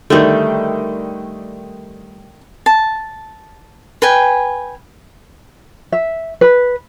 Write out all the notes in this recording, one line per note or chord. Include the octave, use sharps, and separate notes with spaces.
D3 D#3 G3 A3
A5
B4 G5 G#5
E5
B4